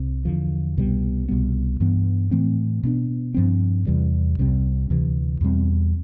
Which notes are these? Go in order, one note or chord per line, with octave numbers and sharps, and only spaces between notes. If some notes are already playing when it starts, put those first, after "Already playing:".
Already playing: C2 C3
E2 D3 F3
C2 B2 G3
C2 B2 G3 B3
G2 E3 B3
A2 E3 A3 C4
B2 B3 D4
G2 F3 C4
E2 C3 E3 G3
C2 C3 G3 C4
D2 C3 E3
E2 B2 G3 C4